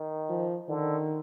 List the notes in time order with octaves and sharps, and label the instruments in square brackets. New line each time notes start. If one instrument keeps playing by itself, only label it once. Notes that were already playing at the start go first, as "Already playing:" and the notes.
Already playing: [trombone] D#3
[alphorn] F3
[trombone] D3 [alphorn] D#3